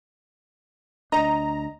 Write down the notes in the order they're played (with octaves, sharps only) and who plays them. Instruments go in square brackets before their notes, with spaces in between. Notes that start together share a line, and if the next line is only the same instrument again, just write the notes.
[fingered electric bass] D2 D4 [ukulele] D#5 [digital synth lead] A#5